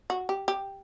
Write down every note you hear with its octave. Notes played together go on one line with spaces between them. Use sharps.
F#4
G4
G4